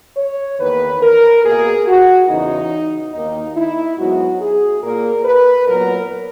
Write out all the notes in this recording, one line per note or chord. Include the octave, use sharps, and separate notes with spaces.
C#5
E2 D#3 A#3 B4
A#4
B2 A#3 G#4
F#4
E2 C#3 E3 D#4
D#2 D#3 A#3 D#4
E4
G#2 F#3 B3 F#4
G#4
A#2 A#3 A#4
B4
A#2 F#3 B3 A#4